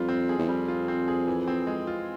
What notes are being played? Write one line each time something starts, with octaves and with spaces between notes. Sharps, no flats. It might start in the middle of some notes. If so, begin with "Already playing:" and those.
Already playing: F2 G3 F4
C4
G#4
E2
F2 G3
F4
C4
G#4
E3
C4
G#3
F4